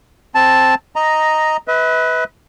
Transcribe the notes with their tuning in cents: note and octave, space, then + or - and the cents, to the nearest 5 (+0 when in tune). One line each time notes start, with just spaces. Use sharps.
C4 +5 A5 +0
D#5 +0 A#5 +0
B4 +5 E5 -45